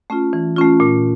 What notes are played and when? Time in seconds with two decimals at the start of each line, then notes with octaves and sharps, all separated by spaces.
0.10 A3 C#4 F4
0.33 E3
0.56 A3 C#4 F4
0.80 A#2